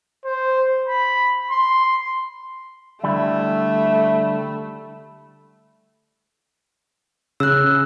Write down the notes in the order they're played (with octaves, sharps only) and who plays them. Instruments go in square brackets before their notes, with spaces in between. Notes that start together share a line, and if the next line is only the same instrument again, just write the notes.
[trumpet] C5
B5
C6
[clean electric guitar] D3 G3 E4 [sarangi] A3 [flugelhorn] E5
[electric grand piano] C#3 [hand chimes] E6 F#6